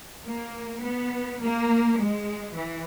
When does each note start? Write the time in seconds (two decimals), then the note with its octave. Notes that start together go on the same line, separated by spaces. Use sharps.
0.26 A#3
0.83 B3
1.41 A#3
1.99 G#3
2.56 E3